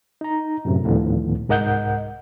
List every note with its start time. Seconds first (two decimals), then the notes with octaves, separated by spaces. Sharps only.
0.21 D#4 A#5
0.65 F#2 A2 C3
0.84 D2 A2 D3 D#3 F3 B3
1.48 C2 G#2 A#4 D#5 F#5 G6